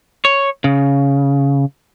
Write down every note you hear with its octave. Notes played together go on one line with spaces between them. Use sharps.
C#5
C#3